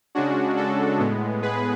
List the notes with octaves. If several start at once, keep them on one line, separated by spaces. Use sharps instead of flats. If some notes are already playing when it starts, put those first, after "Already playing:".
C#3 G#3 C#4 D4 F#4
F#4 A4
A2 G#3 B3
G#4 B4